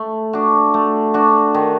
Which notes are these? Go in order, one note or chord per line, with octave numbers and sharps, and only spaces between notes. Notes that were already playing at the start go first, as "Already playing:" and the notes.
Already playing: A3
D4 F#4
A3
D4 F#4
D#3